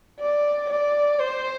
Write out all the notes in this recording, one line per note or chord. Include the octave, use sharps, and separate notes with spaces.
D5
D5
C5